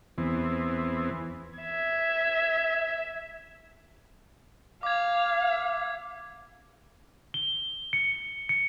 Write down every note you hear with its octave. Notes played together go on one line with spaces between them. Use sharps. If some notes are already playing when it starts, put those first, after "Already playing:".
E2 E3 B3 C4
E5 G#6
F5 D6 G#6
G7
C#7
C#7